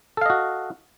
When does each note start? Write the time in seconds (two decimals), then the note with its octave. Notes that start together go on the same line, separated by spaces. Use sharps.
0.17 A4
0.21 F5
0.26 D#5
0.30 F#4